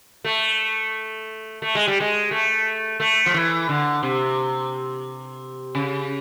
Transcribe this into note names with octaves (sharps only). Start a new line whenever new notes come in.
A3
A3
G#3
G3
G#3
A3
A3
F3
E3
D3
C3
C#3